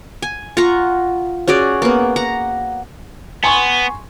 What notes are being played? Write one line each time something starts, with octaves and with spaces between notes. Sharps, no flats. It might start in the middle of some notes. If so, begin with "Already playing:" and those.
G#5
F4 F#5 A#5 C#6
C#4 F#4 G#4 D5
A#3 B3
F#5 A#5
B3 G#5 C6 C#6